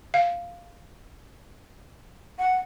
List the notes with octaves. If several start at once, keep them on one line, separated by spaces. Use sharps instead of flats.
F5
F#5